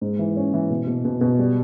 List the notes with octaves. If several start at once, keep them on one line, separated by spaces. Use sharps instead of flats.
G#2
E3
C#4
E3
B2
B2
B2
B2
G3